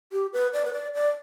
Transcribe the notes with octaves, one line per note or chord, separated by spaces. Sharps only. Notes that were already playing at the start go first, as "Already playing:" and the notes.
G4
B4
D5
B4
D5
D5